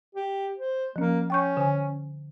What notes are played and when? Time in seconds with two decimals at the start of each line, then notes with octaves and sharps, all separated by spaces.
0.15 G4
0.58 C5
0.96 F3 A#3 C#4
1.30 C#4 G5 C#6 G6
1.57 D3 G#5